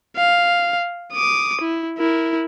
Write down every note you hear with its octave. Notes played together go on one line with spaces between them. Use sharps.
F5
D6 D#6
E4
E4 A#4